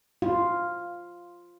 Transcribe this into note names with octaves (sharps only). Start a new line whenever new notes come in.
F4